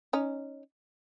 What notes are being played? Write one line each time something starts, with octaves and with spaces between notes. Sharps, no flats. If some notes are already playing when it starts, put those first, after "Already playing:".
C#4 D#4